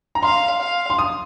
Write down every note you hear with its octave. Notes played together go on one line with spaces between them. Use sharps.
A#5
F5 C6
F5
C6
D#6